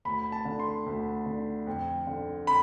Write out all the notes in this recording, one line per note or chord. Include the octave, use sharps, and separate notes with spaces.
D2 B5
A5
D3
C6
D2
D3
F2
D3
B5